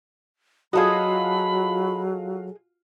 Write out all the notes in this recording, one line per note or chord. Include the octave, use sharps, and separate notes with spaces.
F#3 F4 F#4 G#4 A4 D#5 B5